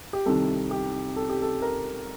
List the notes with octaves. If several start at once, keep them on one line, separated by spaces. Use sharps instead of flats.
G4
C2 C3 D#3 A4
G4
A4
G4
A4
A#4